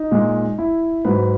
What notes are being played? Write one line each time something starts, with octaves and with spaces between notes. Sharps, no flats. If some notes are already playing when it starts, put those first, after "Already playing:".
Already playing: D#4
A#2 G#3
E4
G#2 F#3 B4